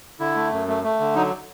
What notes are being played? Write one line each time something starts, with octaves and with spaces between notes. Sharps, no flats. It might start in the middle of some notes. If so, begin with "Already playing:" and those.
D3 E4
A3
F#2
A3
A3
D3
F#3 D#4